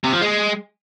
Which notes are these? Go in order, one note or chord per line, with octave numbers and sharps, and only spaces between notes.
C3
F3
G#3